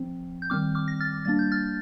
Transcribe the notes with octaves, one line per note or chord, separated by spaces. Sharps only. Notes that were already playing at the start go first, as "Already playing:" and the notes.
Already playing: F3 C4
G6
D#3 G3 C4 D6 F6
D6 F6
A#6
F6 A6
G3 A#3 D4 A6
G6
F6 A6